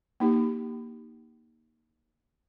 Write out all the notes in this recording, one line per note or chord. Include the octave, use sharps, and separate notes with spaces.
A#3 D#4 G4